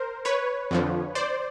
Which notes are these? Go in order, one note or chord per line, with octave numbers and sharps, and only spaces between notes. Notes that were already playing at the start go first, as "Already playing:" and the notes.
Already playing: A#4 C5
B4 C#5
F2 D3 F3
C5 D5